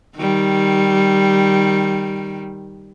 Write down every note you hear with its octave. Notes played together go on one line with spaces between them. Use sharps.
D#3 G3